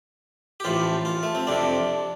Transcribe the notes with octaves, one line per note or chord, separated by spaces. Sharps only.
G4
A1 A2 F3 F4
F4
A3
C4
F2 C3 F3 D4